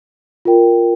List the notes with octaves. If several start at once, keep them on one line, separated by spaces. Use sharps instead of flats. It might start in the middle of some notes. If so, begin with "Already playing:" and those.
F4 A#4 G5